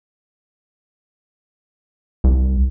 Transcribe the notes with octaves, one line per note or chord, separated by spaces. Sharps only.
C2